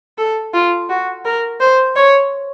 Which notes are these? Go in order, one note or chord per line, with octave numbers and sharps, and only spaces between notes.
A4
F4
F#4
A#4
C5
C#5